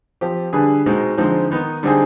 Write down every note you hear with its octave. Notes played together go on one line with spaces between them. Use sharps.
F3 C4 G4
D3 G3 D4 G#4 B4
B2 G#3 C4 D#4
D3 F3 G#3 C4 D#4
D#3 B3 D#4
D3 G3 C4 D#4 G#4